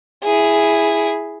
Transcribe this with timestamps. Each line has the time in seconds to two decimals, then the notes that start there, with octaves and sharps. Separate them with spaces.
0.24 E4 G#4